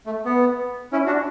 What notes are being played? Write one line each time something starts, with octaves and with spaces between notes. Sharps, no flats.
A3
B3
C#4 E4
D4 F#4